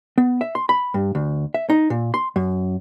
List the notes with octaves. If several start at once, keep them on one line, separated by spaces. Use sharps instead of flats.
B3
E5
C6
B5
G2
D2
E5
D#4
A#2
C6
F#2